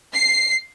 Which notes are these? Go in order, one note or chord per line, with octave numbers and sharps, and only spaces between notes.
C7